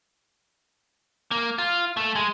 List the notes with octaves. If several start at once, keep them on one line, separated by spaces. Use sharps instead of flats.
A#3
F4
A3
G#3